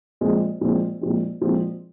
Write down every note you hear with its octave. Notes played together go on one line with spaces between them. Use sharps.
A#2 F3 G#3 C4
A#2 F3 G#3 C4
A#2 F3 G#3 C4
A#2 F3 G#3 C4